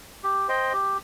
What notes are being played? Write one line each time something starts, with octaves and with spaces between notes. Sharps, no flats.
G4
C5 D#5 G5
G4